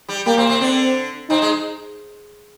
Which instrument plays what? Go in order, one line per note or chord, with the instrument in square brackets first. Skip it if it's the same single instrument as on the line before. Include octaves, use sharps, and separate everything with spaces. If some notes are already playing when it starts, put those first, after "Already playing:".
[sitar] G3 G4
[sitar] G3 G4 [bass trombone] A#3
[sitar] C3 C4
C3 C4
[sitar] D3 D4 [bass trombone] C4
[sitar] C3 C4 [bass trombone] D#4
[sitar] G#3